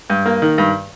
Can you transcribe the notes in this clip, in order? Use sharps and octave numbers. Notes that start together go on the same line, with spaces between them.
G2
A#3
D#3
G2